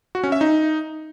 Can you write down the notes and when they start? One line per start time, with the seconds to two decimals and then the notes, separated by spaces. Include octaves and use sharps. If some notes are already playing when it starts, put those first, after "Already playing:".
0.15 F#4
0.23 C#4
0.32 E5
0.41 D#4